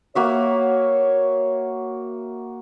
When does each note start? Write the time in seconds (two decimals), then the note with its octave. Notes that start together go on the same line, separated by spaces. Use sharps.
0.15 A#3 F#4 C#5 E5